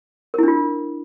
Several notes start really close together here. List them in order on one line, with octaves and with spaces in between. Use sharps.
A#4 E4 D4 F4